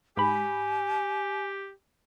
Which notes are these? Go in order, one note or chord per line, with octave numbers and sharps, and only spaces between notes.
G#2 G4 G#5 B5